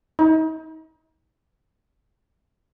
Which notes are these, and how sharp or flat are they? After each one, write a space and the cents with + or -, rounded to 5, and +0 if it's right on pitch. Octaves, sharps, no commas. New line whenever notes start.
D#4 +45